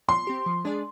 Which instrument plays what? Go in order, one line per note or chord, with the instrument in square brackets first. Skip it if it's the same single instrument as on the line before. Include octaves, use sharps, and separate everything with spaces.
[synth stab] F3 [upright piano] C6
[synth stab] C4 G4
F3
G#3 D4 G#4 D5